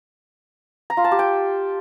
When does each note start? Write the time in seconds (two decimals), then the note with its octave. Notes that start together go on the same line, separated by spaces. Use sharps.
0.90 A#5
0.97 F4
1.04 A5
1.12 G4
1.19 G5